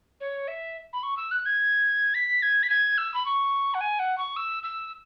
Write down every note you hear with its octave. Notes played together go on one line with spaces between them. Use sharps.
C#5
E5
B5
C#6
E6
F#6
G#6
B6
G#6
B6
G#6
E6
B5
C#6
F#5
G#5
F#5
C#6
E6
E6